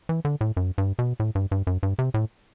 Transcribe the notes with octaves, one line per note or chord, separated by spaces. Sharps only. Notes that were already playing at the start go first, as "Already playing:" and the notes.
E3
D3
A2
F#2
G2
B2
A2
G2
G2
F#2
G2
C3
A2